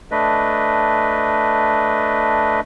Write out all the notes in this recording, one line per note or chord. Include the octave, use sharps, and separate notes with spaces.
A3 D4 B4 D#5